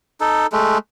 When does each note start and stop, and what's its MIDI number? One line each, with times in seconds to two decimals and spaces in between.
0.21 0.47 63
0.21 0.47 69
0.52 0.78 56
0.52 0.78 57